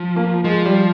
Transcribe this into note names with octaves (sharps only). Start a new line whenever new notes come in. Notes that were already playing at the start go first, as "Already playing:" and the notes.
Already playing: F3
A#3
F3 G#3
G3